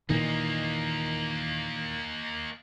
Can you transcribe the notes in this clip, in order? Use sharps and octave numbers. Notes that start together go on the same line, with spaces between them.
A#2 D#3 E3 A#3 D#4